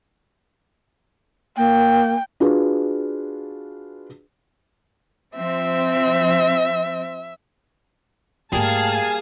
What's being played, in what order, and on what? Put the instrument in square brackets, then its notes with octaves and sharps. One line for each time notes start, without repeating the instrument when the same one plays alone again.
[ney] A#3 [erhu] G5
[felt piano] D4 F4 F#4 G#4 B4
[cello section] F3 C4 [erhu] E5
[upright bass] G#2 A3 [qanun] G3 A#3 [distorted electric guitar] G#4 [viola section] F5 G#5 A5